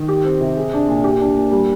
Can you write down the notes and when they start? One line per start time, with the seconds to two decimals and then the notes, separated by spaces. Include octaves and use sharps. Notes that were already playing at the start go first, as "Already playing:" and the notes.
Already playing: D#3
0.08 G4
0.24 C4
0.41 C3
0.57 G#4
0.73 D4
0.88 A#2
1.04 G4
1.20 D4
1.36 A#2
1.51 G3